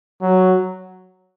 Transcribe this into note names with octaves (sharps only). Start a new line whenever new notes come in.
F#3